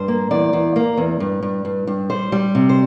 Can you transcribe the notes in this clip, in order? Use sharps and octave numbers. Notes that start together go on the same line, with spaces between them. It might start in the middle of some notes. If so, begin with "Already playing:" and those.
Already playing: G2 C5
A#3
E2 D5
E2
A#3
E2
G2
G2
G2
G2
G3 C5
G3
C3
C5